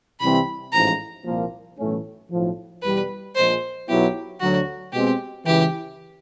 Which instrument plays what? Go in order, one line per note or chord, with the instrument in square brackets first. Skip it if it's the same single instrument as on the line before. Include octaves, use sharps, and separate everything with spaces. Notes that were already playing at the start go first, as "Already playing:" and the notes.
[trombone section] C2 C3 E3 G3 C4 [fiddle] B5
[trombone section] A1 G#2 F3 [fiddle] A#5
[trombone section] C2 A#2 F3 A#3
B1 A2 E3 A3 C#4
B1 A2 F3
[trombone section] E2 B2 G3 [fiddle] B4
[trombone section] A#1 A#2 F3 G#3 [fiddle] C5
[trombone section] B1 B2 F#3 B3 E4 [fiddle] G4
[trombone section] D2 D3 F#3 [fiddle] F#4
[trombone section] B2 G#3 C4 [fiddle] G4
[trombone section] C#2 C#3 E3 [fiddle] G4